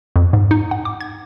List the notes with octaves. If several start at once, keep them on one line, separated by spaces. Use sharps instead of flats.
F2
G#2
D#4
F#5
D6
G#6